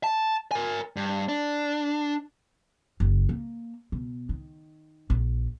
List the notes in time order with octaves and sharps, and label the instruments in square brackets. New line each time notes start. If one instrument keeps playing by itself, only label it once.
[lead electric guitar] A5
A#4 G#5
G2
D4
[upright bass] F#1
A#3
B2
D#3
A#1